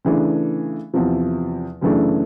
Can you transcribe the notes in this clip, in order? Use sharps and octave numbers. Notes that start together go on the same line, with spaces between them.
C#3 E3 A3 D4
E2 C3 F3
F#2 C#3 E3 A3 D4